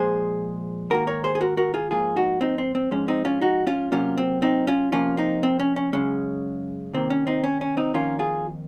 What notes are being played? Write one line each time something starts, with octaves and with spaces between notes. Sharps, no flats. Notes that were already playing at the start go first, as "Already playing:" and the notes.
Already playing: A#2 F3 G#3 G#4 C5
G#2 D#3 A#3 F#4 A#4
A#4 C#5
G#4 C5
G#4
F#4 A#4
F#4 A#4
F4 G#4
G#2 F3 A#3 F4 G#4
D#4 F#4
C4 D#4
C4
C4
G#2 F3 G#3 C#4
C4 D#4
C#4 F4
D#4 F#4
C#4 F4
C3 F#3 A#3 C#4 F4
C4
C4 D#4
C#4 F4
C3 F3 A#3 C#4 F4
C4 D#4
C4
C#4
C#4
F#2 C#3 G#3 C#4
C3 D#3 A#3 C4
C#4
C4 D#4
C#4
C#4
C4 D#4
F2 D#3 A#3 C#4 F4
F4 G#4